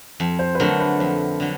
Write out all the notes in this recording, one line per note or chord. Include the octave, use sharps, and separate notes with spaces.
F2
C5
B4
D3 F#3 A3 A#4
B4
F2 C5
D3 F#3